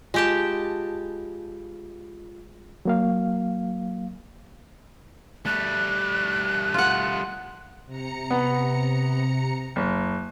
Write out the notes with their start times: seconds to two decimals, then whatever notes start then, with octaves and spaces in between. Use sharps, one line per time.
0.14 G#3 F4 G4 A5
2.85 F#3 A#3 F5
5.46 G3 A3 F#6
6.74 F4 F#5
7.87 C3 A#5 C#7
8.30 B3
9.76 F#1